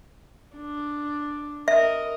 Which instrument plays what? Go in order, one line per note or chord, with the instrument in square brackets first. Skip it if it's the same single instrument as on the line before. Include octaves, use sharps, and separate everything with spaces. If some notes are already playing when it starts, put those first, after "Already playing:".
[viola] D4
[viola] A#4 D#5 [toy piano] E5